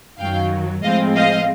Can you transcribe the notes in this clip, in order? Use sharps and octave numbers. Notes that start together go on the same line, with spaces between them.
F#2 D#3 F#3 F5 G5
A2 F3 G#3 C4 D#5 F5
D#5 F5